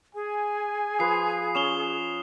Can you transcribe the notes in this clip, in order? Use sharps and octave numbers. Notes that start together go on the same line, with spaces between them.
G#4 G#5
F3 B4 C5 D#6 C7
C#4 E7 F7 G7